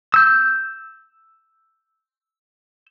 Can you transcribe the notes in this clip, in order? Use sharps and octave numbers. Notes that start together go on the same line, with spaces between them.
E6 G6